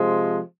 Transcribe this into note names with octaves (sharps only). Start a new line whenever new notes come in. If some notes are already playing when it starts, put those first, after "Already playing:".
Already playing: C3 F3 G#3